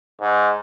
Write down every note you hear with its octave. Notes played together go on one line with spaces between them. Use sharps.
G#2